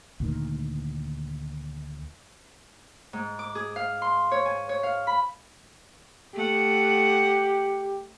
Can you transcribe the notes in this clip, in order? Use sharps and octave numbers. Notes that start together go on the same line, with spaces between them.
D2 A#2 D#3
G#2
D6
G#4
F5
C6
C#5
G#5
C#5
F5
B5
A3 G4 F#5